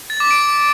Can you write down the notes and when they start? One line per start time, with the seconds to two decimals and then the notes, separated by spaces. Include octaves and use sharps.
0.10 A6
0.20 D6
0.31 D7